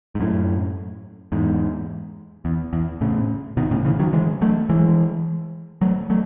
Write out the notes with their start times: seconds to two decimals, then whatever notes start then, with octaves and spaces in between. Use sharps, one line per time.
0.15 G#2
0.20 F#2 A2
1.32 E2 G#2
2.45 E2
2.73 E2
3.01 A2 C#3
3.57 B2 D#3
3.71 A2 C#3
3.85 C#3 E3
3.99 D#3 F#3
4.13 E3 G#3
4.41 F#3 A3
4.69 E3 G#3
5.81 F#3 A3
6.10 F#3 A3